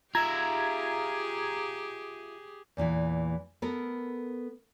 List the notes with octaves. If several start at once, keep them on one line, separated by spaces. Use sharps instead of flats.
F4 G4 G#4 E5 A#5 G#6
E2 A#2 D#3 E3
B3 A4 A#4